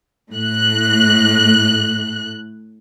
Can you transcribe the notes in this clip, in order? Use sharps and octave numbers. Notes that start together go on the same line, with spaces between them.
A2 F#6